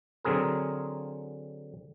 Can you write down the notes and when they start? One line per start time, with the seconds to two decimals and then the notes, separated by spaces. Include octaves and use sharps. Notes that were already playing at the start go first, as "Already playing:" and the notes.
0.25 D3 F#3 C4 G#4 A#4